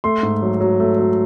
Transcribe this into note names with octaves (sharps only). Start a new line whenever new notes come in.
A3 C6
G#2
F#3
F#3
A3
F#3